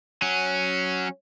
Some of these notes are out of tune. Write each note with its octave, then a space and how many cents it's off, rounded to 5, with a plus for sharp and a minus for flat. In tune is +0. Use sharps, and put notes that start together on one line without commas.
F#3 +0 C#4 +0